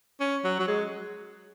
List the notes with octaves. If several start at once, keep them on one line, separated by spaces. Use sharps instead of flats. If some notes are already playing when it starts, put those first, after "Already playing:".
C#4
F#3
F#3
G#3